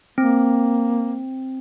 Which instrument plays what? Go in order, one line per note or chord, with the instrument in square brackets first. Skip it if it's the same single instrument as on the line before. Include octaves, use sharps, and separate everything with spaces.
[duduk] A#3 [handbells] C4